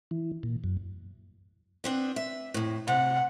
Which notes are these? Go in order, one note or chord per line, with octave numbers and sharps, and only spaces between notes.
E3
A#2
F#2
B3 C4 D4
E5
F2 A2
C3 F#5